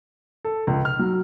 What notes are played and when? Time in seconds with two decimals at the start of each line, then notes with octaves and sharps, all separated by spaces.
0.45 A4
0.67 C#2
0.85 F6
0.99 F#3